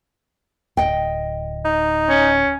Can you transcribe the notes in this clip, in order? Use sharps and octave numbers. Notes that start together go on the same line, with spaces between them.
D1 D#5 G5
D#4
C#4